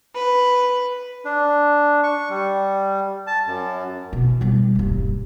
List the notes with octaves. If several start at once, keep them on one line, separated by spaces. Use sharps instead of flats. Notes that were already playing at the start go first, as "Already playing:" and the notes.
B4
D4
C#6
G3
A5
F#2
B2
B2 G3
D#1 G2